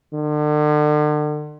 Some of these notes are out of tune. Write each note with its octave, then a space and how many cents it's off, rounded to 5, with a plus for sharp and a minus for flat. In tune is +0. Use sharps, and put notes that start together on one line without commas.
D3 +40